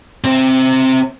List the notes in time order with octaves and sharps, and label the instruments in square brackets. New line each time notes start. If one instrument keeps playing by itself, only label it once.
[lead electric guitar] C3 C4